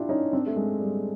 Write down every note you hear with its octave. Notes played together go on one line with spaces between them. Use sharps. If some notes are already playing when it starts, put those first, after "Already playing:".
Already playing: D4 E4 F4 G4
C#4 D#4
C4 D4
A3
G#3
G3